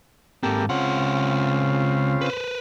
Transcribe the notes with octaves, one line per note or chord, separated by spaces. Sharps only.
G#2 A#3 C4 G4 A4
C#2 C#3 C4 F4 F#5
B4 C5